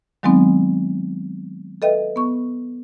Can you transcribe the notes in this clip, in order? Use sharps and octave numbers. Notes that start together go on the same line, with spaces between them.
D#3 F#3 G#3 B3 C4 D#4
A4 B4 D#5 E5 G5
B3 C#6